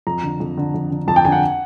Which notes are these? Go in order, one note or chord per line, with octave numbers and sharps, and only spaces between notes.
F2 A#5
D3
F2
D3
F2
D3
F2 A5
G5
D3 G#5
F#5